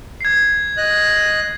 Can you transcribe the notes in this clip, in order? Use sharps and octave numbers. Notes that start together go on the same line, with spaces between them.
G#6 C7
D#5 F#6